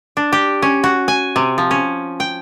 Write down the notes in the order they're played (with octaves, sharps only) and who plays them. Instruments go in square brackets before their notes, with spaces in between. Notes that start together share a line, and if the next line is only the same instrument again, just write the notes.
[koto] D4
G4
C#4
F#4
G#5
C3
F3
C#4
G5